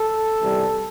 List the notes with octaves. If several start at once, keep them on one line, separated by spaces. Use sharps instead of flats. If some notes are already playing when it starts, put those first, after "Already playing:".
Already playing: A4
C3 E3 G3